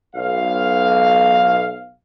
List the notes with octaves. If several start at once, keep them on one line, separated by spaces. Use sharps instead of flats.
B1 F5